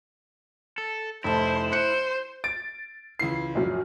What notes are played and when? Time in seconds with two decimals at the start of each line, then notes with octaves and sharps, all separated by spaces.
0.78 A4
1.24 F1 E4 C5 A5
1.72 C5 F#6 C#7
2.44 A6 D7
3.19 C#2 E3 C7
3.55 A#1 F#2